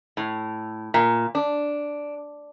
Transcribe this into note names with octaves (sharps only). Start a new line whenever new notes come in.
A2
A#2
D4